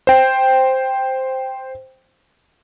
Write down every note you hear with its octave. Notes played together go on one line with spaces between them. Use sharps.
C5 G5